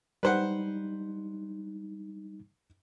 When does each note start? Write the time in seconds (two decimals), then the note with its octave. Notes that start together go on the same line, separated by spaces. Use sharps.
0.23 G3 D#4 B4 C5 F#5